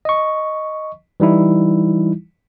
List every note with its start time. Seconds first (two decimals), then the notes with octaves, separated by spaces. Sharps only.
0.05 D#5 C#6
1.20 E3 G3 D#4 E4